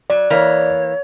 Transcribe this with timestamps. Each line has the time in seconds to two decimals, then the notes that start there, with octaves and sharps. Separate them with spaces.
0.10 F#3 D5
0.30 E3 A#3 C#5